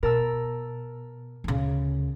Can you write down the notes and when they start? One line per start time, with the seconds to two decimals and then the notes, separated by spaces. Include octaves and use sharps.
0.03 B2 A#4 A5 E6
1.44 D2 C#3